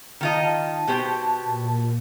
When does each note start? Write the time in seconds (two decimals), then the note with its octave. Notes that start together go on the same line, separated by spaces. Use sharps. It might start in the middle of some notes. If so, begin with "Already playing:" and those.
0.21 D#3 F4 D#5 A5
0.87 B2 G4 C5
1.44 A#2